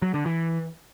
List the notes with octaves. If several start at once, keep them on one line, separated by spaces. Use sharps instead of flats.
F#3
D3
E3